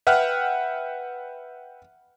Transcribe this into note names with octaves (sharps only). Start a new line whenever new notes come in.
B4 E5 F#5 G5 F6